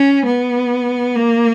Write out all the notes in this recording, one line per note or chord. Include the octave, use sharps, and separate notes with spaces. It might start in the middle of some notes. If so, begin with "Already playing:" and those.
Already playing: C#4
B3
A#3